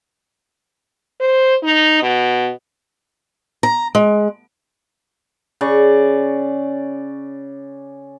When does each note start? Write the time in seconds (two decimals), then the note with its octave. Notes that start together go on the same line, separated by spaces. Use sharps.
1.21 C5
1.63 D#4
2.02 B2
3.63 A#5
3.95 G#3
5.61 C#3 D5 C#6